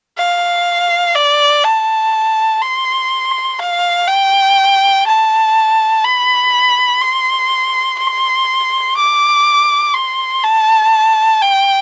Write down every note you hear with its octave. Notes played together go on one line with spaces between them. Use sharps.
F5
D5
A5
C6
F5
G5
A5
B5
C6
C6
D6
C6
A5
G5